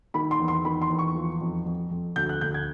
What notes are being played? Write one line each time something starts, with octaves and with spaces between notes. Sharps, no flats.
D#3 B5
C6
E2
C6
D#3 B5
C6
E2
C#6
F3
F2
F2
F2
D2 G6
F#6
D2 G6
G#6